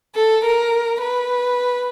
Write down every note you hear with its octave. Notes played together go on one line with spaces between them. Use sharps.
A4
A#4
B4